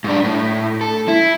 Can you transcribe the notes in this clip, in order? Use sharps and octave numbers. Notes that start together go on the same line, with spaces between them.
G#2 D4
A2
A4
E4